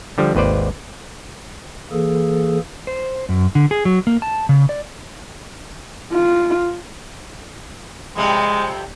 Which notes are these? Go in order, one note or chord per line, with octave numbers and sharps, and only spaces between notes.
D3 F3 G3
G#1 D#2 B4 C5 D5
E3 A#3 G#4 A4
C5
F#2
D3
G#4
F#3
A#3
A5
C#3
D5
F4
F2 C3 G3 G#3